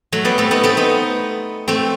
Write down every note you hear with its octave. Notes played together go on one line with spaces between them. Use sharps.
F#3 A3
G3 B3
A3 C4
B3 D#4
A3 C4
B3 D#4
A3 C4